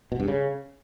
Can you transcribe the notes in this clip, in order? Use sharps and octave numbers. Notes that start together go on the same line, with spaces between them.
B2
G2
C#3